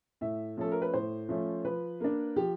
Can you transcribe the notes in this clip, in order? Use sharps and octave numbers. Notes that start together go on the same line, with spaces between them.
A2 E5
F3 A3 C#4 A4
A#4
B4
A2 C5
F3 A3 C#4
F3 B4
A#3 D4
F3 G4